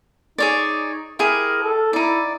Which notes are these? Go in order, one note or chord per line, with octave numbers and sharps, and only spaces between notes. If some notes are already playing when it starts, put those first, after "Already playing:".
D#4 G#4 C#5 D5
E4 G4 G#4 A#4
A4
D#4 E4 D5